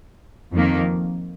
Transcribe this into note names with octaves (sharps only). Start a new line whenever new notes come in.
F2 D#3 A#3